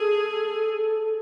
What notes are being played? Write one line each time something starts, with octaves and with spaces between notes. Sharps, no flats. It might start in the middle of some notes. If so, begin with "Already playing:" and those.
Already playing: G#4 A4